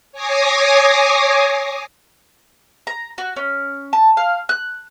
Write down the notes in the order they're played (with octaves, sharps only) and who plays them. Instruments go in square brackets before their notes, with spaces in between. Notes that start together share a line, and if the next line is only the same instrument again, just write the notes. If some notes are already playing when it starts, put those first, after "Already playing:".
[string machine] C#5 G#5 D6 D#6 A#6 C7
[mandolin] A#5
F#4
C#4
A5
F5
F#6